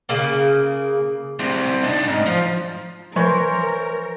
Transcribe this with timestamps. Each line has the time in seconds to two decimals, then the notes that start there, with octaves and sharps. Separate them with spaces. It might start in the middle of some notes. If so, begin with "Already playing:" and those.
0.09 C#3 A#3
1.39 C2 C3
1.83 D4 D#4
2.08 G#2
2.26 F3
3.16 E3 F3 A#4 C5 C#5 C6